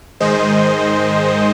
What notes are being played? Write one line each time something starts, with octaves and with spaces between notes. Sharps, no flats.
G#2 D#3 G#3 C5 D#5